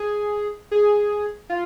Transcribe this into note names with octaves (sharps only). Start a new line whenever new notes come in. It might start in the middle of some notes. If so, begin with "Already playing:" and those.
Already playing: G#4
G#4
F4